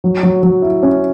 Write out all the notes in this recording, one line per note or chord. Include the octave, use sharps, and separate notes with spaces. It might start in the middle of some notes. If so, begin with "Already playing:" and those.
F#3
F#3
F#3
E4
C#4